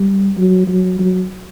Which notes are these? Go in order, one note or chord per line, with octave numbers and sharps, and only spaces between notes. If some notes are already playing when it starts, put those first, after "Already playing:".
Already playing: G3
F#3
F#3
F#3